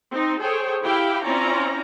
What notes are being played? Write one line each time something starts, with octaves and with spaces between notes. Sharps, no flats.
C4 D#4
G#4 A4 C5 C#5 G5
E4 G4 F5 G5 B5
C4 C#4 E4 F4 D5 A#5